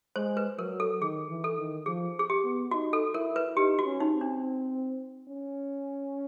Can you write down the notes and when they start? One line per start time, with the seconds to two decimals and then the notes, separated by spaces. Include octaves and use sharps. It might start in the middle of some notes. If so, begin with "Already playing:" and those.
0.16 G#3 C5
0.37 B4
0.59 F#3 A#4
0.80 A4
1.01 D#3 G#4
1.30 E3
1.44 A4
1.58 D#3
1.86 F3 G#4
2.19 G#4
2.30 G4
2.44 B3
2.71 D#4 F#4
2.93 A4
3.14 E4 A#4
3.36 B4
3.57 D#4 G4
3.79 F#4
3.85 C#4
4.00 D#4
4.14 C4
4.21 D4
5.28 C#4